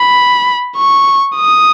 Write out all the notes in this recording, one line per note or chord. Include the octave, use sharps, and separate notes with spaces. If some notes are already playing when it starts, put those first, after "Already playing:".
Already playing: B5
C#6
D#6